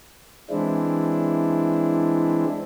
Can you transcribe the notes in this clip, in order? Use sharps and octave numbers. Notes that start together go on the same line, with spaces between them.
E3 G#3 C4 D4 E4